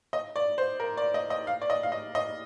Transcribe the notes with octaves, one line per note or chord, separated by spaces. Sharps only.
D#5
D5
C5
A#4
D5
D#5
D#5
F5
D5
D#5
F5
D#5
D#5